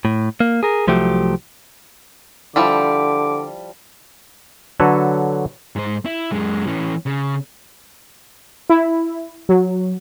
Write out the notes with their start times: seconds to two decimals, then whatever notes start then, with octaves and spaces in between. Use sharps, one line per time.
0.05 A2
0.40 A#3
0.63 G#4 A#4
0.87 C2 F3 F#3 A3 G4
2.56 D3 F3 G3 E4 D6
4.80 D3 F#3 F#4 A4 B4 C#5
5.76 G#2 C5
6.05 E4
6.32 F#2 G#3
6.67 E3 C#4
7.06 C#3
8.70 E4
9.49 F#3